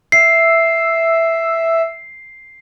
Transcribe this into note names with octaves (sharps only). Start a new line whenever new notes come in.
E5 C7